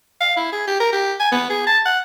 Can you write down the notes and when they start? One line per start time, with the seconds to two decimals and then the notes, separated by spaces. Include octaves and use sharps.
0.21 F5
0.37 E4
0.53 G#4
0.67 G4
0.80 A#4
0.93 G4
1.20 G#5
1.32 B3
1.50 G#4
1.67 A5
1.86 F#5